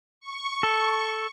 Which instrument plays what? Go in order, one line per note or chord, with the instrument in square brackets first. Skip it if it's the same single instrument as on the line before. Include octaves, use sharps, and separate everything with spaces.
[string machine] C#6
[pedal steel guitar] A4